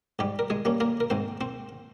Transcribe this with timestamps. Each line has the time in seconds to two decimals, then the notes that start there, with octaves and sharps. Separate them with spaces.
0.19 G#2 G3 G4
0.39 A#4
0.50 G#3 G#4
0.65 G3 A#3 C#4
0.80 A#3 A#4
1.00 A#4
1.10 G#2 C4 C5
1.41 C4 C5